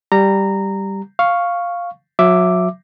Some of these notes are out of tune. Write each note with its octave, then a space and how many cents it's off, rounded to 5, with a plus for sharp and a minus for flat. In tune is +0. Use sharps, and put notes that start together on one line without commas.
G3 +0 A#5 -15
F5 +0 C#6 +0
F#3 -30 E5 +5 D6 +0